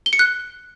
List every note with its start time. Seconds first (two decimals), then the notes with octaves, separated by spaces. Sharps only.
0.06 G7
0.13 C#7
0.19 F#6